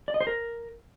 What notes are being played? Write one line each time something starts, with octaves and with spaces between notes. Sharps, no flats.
D5
D#5
C5
A#4